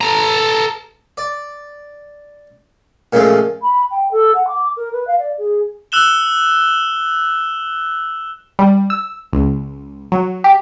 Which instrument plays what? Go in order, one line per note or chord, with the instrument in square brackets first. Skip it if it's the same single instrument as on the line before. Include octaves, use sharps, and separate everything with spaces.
[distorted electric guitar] A4 A#5
[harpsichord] D5
A#2 C#3 F3 G#3 A3
[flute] B5
G5
A4
F#5
D6
A#4
B4
F5
D5
G#4
[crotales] E6 F#6 E7 G7
[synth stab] G3
E6
C#2
F#3
G4